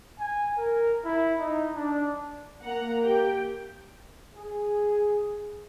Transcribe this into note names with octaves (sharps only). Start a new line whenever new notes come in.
G#5
A#4
E4
D#4
D4
A#3 F#5 A#5
G4 G5
G#4